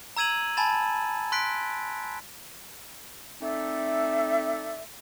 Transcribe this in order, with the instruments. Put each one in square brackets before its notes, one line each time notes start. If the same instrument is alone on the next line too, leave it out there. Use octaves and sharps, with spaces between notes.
[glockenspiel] A#5 E6 G#6 D#7 F#7
G#5 A5 B5 A6 E7
C6 F#6 B6 D7
[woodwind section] A3 C4 D#4 A4 D5 E5